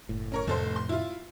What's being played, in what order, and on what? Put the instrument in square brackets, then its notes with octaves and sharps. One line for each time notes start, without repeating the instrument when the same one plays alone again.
[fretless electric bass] F#1 A2
[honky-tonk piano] C#4 A#4 C#5
[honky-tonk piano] F1 A4 C5 [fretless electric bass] F2 A2 C3
[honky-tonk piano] C6
E4 F4